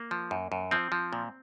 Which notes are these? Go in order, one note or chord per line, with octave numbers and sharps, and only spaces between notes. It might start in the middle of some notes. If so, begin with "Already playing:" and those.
Already playing: A#3
F3
F#2
F#2
F3 C4
F3
A#2